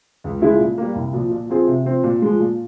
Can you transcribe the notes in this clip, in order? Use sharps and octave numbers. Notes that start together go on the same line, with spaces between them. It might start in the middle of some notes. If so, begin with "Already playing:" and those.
C#2
C#3 F3 G#3 E4
A#2
G3 A#3
C2
A#2 F3
A#2
F3 C4 F4 G#4
C3
F3 C4
A#2
F3 G#3
A#2